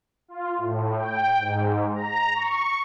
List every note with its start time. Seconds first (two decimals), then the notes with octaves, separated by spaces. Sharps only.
0.28 F4
0.58 A2
0.96 G5
1.40 G#2
1.94 A#5
2.34 C#6